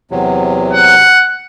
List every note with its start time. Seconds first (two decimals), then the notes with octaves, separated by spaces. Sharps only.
0.11 E2 C3 F#3
0.73 F#5